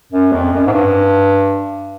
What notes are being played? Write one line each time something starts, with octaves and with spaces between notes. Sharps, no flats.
F#2
F2
F#2
G#2
G2